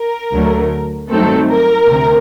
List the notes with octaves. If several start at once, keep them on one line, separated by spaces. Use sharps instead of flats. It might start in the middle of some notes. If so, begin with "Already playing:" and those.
Already playing: A#4
D2 D3 F#3 A3
G2 D#3 F#3 A3 C4 A4
A#4
D2 C3